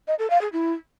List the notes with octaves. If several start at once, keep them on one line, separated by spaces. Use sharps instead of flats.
D#5
A4
F5
G#4
E4